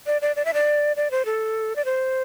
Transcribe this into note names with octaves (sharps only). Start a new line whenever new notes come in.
D5
D5
D5
E5
D5
D5
C5
A4
D5
C5